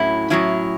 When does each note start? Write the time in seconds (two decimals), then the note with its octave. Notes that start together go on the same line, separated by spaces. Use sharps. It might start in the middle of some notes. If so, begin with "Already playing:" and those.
Already playing: A2 F#3 C#4 E4
0.30 A2 F#3 C#4 E4